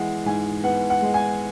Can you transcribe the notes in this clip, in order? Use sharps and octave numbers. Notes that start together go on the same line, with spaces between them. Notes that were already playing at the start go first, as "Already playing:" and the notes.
Already playing: E3 G#3 B3 F#5
G#2 G#5
B3 F#5
F#5
G#3
G#5